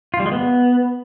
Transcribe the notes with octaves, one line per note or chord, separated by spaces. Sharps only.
F4
G3
G#3
B3